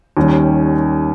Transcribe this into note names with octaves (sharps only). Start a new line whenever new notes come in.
D#2 D#3 G3 C#4